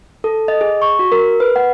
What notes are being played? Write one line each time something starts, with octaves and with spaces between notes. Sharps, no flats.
A4
D#5
G#4
C#6
F#4
A#4
B4
F#5